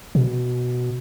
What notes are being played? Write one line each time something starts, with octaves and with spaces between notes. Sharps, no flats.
B2